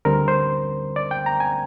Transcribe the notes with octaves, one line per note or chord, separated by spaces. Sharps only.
D2 D3 G3 C4 A#4
C5
D5
G5
A#5
G#5